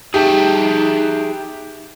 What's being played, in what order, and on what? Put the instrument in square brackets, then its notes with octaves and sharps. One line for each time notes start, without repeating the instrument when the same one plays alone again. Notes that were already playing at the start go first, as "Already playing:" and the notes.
[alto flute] D#4 [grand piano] G4 [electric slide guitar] G#4 E5 A5